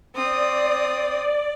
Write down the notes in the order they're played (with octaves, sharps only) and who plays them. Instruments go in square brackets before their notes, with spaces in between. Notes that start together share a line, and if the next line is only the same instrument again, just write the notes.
[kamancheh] C4 D#6 [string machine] D5